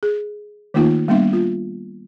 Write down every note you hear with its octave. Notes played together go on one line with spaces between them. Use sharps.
G#4
D#3 A3 A#3 D#4 F4
G3 A#3 B3 D4 E5
F4